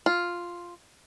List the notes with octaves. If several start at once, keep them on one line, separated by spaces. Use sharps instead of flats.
F4